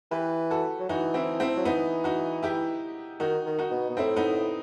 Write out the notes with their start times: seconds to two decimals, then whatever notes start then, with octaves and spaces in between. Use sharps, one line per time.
0.11 E3 G4 B4
0.50 F#4 A4
0.79 F#3
0.89 E3 D#4 F#4
1.14 C4 E4
1.40 C4 E4
1.56 F#3
1.65 E3 B3 D#4
2.04 D#4 F#4
2.43 E4 G4
3.20 D#3 D#4 F#4
3.46 D#3
3.59 D#4 F#4
3.71 B2
3.89 B2
3.97 A2 C4 E4
4.16 B3 D#4